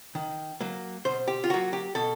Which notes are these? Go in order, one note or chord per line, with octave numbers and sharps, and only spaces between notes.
D#3
F#3 A#3
B2 C5
G4
F4
F#3 A#3 F#4
G4
B2 A4